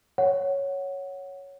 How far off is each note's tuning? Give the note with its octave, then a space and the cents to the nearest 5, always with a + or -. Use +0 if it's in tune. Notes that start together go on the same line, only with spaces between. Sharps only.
C#5 +0 F#5 +0